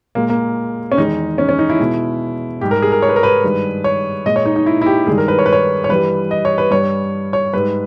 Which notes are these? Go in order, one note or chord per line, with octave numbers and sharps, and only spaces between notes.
A#2 G#3 A#3
A#3
C#4
E2 D#3 G#3 D#4
C#4
C#4
D#4
E4
B2 G#3
G#2 G3 G4
A#4
G#4
A#4
C#5
B4
A#4
B4
G2 D#3 G#3
C#5
A#2 G#3 D#5
C#5
D#4
D#4
E4
E4
G4
G2 D#3 G#3 G#4
A#4
B4
C#5
B4
C#5
C#5
G2 E3 G3 B4
D#5
C#5
B4
G2 G3 C#5
C#5
G#2 G3 B4